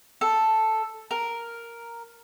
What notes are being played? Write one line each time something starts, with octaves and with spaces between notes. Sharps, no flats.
A4
A#4